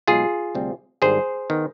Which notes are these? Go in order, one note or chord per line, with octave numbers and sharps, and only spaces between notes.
B1 B2 G#3 F4 G#4
D2 C3 G3 C4
G#1 G#2 G3 D4 G#4 C5
D#3 B3